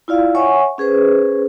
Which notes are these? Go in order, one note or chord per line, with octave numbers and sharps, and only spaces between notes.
E4 F4 D5 F5
C#5 E5 F#5 G#5 C#6
C#4 G#4 B4 C5